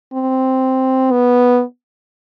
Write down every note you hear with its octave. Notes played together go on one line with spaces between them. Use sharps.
C4
B3